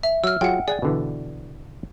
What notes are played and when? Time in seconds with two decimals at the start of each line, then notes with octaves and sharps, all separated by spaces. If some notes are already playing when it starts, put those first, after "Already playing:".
0.03 E5
0.24 F#3 E6 F6
0.41 F#3 F4 G#4 F#5 G5
0.68 G#4 D5 F#5 G#5
0.82 B2 D3 E3